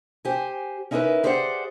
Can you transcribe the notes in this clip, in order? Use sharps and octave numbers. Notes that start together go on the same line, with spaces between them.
G4 C5 G#5
C#4 D#4 E4 G4 A#4 B4
G4 G#4 C5 D5 E5 F#5